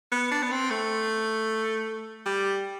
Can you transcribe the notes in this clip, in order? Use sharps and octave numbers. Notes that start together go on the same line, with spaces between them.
B3
D4
B3
C4
A3
G3